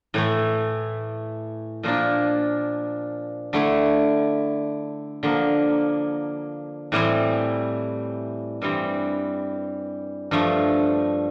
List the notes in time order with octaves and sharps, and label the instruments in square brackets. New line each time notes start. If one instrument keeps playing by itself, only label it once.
[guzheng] A2 E3 A3
A#2 F3 A#3 D4
D3 A3 E4
D3 F3 A#3
A2 E3 G3 C4 E4
G2 E3 G3 C4
G2 F3 A3